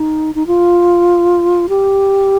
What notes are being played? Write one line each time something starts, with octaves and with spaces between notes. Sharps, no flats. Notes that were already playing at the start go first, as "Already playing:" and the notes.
Already playing: D#4
D#4
F4
G4